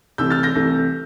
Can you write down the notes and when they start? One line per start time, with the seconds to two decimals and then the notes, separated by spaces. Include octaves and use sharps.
0.18 C2 C3 E3 A3 E6 G6
0.31 F6 A6
0.43 G6 A#6
0.55 C2 C3 E3 A3